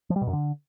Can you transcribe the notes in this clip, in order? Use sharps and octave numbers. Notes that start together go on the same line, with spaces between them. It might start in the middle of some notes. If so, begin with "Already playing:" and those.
F3
G3
B2
F#2
D3